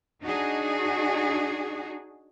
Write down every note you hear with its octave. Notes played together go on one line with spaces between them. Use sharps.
D4 D#4 F#4 G#4